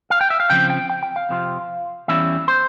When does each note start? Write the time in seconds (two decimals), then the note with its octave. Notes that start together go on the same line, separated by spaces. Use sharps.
0.10 F5
0.21 G5
0.30 E5
0.40 F5
0.50 C#3 F3 C4 G5
0.70 G5
0.90 G5
1.03 G5
1.16 F5
1.29 F2 C3 F3 C4 F4
2.08 E2 E3 G3 C#4 E4 E5
2.48 C5